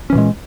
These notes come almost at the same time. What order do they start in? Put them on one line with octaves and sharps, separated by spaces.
C#4 E3 A#2 G#3